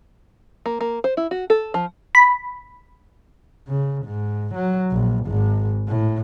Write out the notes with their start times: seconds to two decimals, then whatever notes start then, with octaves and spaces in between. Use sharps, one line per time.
0.66 A#3
0.81 A#3
1.04 C5
1.17 E4
1.31 F#4
1.50 A4
1.74 F3
2.15 B5
3.68 C#3
4.06 G#2
4.55 F#3
4.91 A#1
5.26 G#1 G#2
5.88 A2